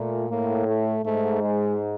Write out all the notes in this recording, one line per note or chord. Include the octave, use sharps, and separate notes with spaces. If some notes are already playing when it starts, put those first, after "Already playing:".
Already playing: A#2 A3
A2 A#3
A3
G#2 A3
G#3